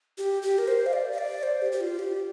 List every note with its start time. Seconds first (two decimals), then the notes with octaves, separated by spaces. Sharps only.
0.18 G4
0.43 G4
0.58 A#4
0.68 C5
0.86 F5
0.93 D5
1.12 F5
1.18 D5
1.43 C5
1.62 G4
1.72 G4
1.81 F4
1.99 G4